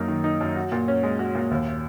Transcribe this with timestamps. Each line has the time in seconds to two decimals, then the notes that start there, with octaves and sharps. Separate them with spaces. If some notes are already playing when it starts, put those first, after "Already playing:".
Already playing: F#2 A#3 D#4
0.08 D#3
0.24 D#4
0.41 F#2
0.56 F#4
0.72 A#2
0.88 C#4
1.03 G#3
1.19 F#4
1.35 A#2
1.51 D#2